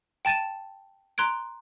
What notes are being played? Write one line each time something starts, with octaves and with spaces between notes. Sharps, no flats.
G5 A5 A6 D#7 E7
A#5 C6 F#6 G#6 D7